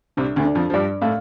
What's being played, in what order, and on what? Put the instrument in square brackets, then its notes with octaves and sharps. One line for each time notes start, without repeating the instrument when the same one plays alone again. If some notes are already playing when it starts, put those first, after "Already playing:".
[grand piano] C2 C3 [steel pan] D4
[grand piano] D2 D3
[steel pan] D4
[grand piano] F2 F3
F3
[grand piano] G2 G3 [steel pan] D5
[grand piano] A2 A3 [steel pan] F5